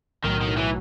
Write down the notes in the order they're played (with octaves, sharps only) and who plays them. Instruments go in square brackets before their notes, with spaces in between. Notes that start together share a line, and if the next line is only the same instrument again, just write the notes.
[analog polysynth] B1 A2 F#3 [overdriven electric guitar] D#3
[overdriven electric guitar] D#3
E3